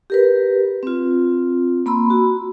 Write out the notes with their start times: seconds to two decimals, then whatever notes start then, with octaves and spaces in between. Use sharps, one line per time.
0.10 G4 A#4 B4
0.83 C4 F4
1.86 A#3 B5 C6 E6
2.10 F#4